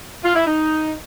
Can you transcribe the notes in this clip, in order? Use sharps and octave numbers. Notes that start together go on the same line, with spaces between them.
F4
E4
D#4